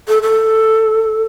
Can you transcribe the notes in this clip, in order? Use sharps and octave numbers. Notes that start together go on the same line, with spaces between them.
A4
A4